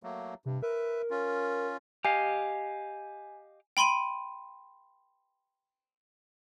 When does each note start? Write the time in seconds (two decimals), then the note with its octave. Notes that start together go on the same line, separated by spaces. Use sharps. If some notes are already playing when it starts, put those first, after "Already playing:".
0.03 F#3 A3 A#3
0.46 G2 C3
0.62 A#4 B4 E5
1.10 C#4 F4
2.05 G4 D#5 F5 G#5
3.77 G5 B5 C6 D#7 F#7